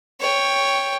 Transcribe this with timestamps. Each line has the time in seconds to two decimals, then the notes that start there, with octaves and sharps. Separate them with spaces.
0.20 C#5 G5